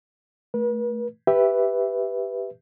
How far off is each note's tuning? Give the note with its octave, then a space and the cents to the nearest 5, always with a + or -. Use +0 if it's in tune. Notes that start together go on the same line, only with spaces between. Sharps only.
A3 +0 B4 -45
G4 +0 B4 +0 E5 +5